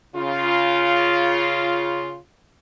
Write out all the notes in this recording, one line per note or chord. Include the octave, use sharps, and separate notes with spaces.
C#3 F4